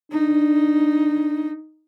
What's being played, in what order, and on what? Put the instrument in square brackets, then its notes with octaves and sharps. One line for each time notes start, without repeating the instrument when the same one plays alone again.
[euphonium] D4 [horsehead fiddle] D#4